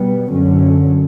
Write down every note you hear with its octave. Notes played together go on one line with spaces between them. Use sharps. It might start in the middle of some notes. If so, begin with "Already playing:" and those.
Already playing: B2 G3 B3
F#2 D3 F#3 C#4